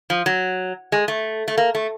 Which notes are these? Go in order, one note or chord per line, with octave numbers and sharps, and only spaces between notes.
F3
F#3
G#3
A3
A3
A#3
A3